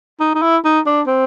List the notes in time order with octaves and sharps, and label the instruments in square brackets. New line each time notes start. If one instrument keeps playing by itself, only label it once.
[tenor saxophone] D#4
D#4
E4
D#4
D4
C4